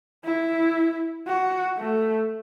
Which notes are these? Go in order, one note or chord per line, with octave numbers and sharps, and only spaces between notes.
E4
F#4
A3